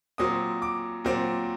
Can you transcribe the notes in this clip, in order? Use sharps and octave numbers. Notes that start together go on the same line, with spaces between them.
A#2 F#3 C4 D#6
D6
A#2 F#3 C4